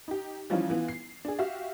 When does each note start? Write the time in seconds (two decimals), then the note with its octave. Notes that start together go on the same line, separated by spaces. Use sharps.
0.08 D#4 G4
0.50 E3 F3 G3 C#4 D#4 F4
0.70 E3 B3 F4
0.88 C7
1.25 D4 G#4
1.39 F#4 G4 E5 F5